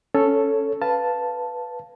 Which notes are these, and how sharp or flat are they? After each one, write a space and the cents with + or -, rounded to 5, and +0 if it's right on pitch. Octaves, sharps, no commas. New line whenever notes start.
C#4 +0 A4 +0 C#5 +0
B4 +0 F5 +0 A5 +0